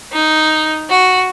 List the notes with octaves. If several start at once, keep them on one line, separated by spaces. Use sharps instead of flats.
D#4
F#4